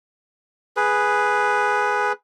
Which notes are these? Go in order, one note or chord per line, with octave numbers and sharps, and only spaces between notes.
G#4 B4